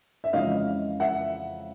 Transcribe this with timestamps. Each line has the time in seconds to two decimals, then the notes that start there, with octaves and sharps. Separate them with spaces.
0.24 E5
0.33 F2 C#3 E3 G#3 D#5 F5
1.00 E5 F#5